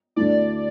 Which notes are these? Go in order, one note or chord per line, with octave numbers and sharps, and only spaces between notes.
D2 D3 A3 E4 D5